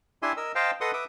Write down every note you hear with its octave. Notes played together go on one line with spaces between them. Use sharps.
D4 E4 G4 E5 G#5 C6
A#4 D#5 E6
C5 D#5 F5 G5 A5
A4 B4 D#5 F#5 C6 D#6
B4 E5 D6 D#6